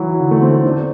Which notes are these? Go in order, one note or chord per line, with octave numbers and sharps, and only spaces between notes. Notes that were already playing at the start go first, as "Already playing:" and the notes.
Already playing: E3 F#3
D3
A3
C4
C4
D4